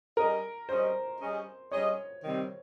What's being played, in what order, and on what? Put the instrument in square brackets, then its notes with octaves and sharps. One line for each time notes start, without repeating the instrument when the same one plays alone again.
[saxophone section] G3 C#4 G#4 D#5 [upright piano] A#4
[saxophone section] G3 C#4 G#4 D#5 [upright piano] C5
[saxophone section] G3 C#4 G#4 D#5
[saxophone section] G3 C#4 G#4 D#5 [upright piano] C#5
[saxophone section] C3 D#3 G3 C4